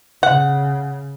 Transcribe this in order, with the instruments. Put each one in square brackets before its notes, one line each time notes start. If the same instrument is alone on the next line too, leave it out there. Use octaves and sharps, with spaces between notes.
[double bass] C#3 [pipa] F#5